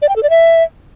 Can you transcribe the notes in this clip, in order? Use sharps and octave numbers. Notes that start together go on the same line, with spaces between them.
D5
G5
A4
D5
E5